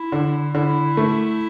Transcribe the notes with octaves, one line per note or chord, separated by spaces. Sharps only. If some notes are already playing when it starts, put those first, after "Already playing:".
Already playing: E4
D3
D3 E4
A3